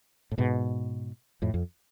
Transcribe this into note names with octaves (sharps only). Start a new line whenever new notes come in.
A2
G#2 B2
F2 A2
F2